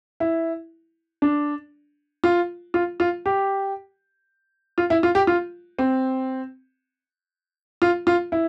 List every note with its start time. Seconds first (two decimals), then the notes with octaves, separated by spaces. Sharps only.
0.20 E4
1.22 D4
2.24 F4
2.74 F4
3.00 F4
3.26 G4
4.78 F4
4.90 E4
5.03 F4
5.15 G4
5.27 F4
5.79 C4
7.82 F4
8.07 F4
8.32 E4